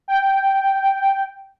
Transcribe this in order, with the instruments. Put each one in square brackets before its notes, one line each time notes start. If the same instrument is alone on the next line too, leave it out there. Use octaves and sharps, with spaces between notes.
[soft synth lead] G5